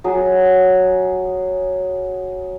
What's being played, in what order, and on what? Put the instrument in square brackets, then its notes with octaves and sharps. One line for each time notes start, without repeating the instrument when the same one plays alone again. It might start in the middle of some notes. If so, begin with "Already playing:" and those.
[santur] F#3 G#4